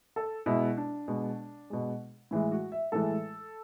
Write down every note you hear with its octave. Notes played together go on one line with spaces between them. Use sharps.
A4
B2 G#3 E4
D4
B2 G#3
B2 G#3
A2 E3 G#3 E4
F#4
E5
A2 E3 G#3 A4